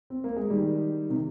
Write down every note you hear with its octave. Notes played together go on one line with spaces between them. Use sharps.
C4
A#3
G#3
D#3 G3
C3 D#3